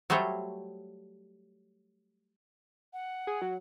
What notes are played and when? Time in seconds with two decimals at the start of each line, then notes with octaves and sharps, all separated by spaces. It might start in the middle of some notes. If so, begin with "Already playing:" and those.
0.10 F#3 G3 A3 C5 C#5
2.93 F#5
3.27 G#4
3.42 F#3